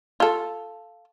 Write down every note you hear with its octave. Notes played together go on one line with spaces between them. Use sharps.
F4 A4